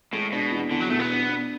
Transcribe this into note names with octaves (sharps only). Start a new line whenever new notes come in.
A2 G#3
B2 D4
E2
E2 D3
F#3
B2 A3
B3
D4
D4